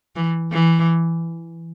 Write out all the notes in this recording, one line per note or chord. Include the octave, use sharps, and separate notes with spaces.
E3
E3